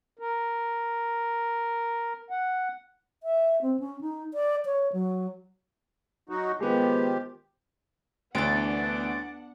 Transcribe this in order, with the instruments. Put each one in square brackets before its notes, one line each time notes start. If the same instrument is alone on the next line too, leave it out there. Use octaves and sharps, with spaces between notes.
[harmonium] A#4
F#5
[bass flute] E5
C4
C#4
D#4
D5
C#5
F#3
[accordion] F#3 D#4 F#4
[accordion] D#3 F3 G4 [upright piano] G#3 B3
[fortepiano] D2 [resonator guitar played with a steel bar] E3 C#4 [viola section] B3 D4 F#5 [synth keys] A6 D7